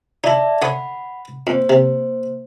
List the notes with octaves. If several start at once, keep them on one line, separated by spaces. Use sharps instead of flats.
D#4 E4 D5 E5 A5
D3 C#5 F#5 B5 D#6
F2 A#3 C5
C3